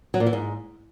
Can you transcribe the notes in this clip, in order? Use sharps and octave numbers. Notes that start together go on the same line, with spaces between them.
F#3
A#2
E3
G#2